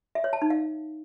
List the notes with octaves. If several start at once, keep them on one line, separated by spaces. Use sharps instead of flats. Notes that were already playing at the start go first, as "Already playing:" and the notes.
E5
C#5
A5
D#4
F5